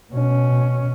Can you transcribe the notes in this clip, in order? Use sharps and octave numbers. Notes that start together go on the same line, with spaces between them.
B2 C#4